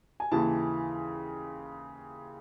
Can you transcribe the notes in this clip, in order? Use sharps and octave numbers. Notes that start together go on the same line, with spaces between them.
G#5
D#2 C#3 E3 A5